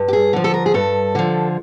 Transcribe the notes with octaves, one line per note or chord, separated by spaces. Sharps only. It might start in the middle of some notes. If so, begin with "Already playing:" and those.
Already playing: G2
G4
G#4
D3 F3
A4
A#4
G#4
G2 A4
D3 F3